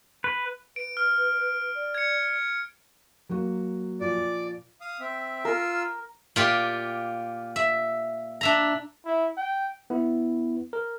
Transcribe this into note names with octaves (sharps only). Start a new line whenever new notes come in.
B4
B4 D7
F6
D5
G#6 C#7
F#3 A#3 F#4
A#2 F3 D5
F5 D#6
C4 E5
F4 A#4 C6 E6
A#2 F4 G4
E5
D4 E5 A#5
E4
G5
B3 E4
A#4